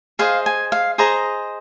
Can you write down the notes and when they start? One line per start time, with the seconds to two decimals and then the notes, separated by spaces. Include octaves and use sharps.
0.19 G#4 C5 D#5 F5
0.46 G#5
0.72 F5
0.98 G#4 C5 D#5 A#5